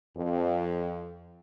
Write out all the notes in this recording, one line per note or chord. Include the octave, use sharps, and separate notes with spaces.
F2